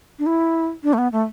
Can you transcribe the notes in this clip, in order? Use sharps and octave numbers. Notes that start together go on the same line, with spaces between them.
D4
E4
D4
A3
B3
A3